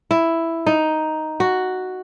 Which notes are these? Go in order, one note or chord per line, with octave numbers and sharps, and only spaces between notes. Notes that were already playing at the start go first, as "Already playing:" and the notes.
E4
D#4
F#4